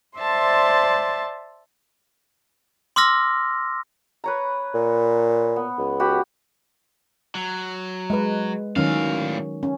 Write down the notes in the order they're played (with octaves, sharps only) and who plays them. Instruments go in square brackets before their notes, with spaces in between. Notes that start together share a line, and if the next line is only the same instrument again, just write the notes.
[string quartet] C5 D5 E5 A5 C6
[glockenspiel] C6 D6 E6 F6 A#6
[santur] B4 C#5 A#5
[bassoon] A#2
[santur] B3
[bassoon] C#2
[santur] F#4 G4 B5
[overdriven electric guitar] F#3
[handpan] G#3 B4
[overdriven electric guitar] A2 F5 [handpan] D#3 F#3 C#4
[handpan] C#4